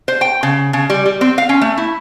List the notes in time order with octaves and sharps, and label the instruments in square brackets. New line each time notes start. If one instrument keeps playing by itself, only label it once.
[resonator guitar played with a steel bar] C5
G5
C#3
C#3
G3
G3
C4
F5
C#4
A3
E4